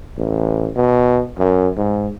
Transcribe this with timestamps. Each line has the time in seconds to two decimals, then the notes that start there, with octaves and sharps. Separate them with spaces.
0.17 A1
0.76 B2
1.38 F#2
1.77 G#2